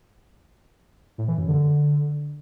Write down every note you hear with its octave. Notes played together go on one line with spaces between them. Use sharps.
A2
E3
F#2
D3